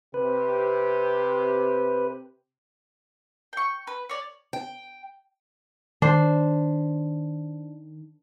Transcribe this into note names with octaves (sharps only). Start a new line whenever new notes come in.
C3 G4 B4
G5 C#6
B4
C#5 D5
G5
D#3 D4 C5